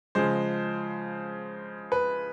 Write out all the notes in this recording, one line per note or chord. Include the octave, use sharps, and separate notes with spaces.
C#3 F3 G#3 C5
B4